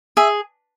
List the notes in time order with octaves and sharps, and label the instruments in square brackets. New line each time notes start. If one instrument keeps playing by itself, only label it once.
[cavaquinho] G#4 E5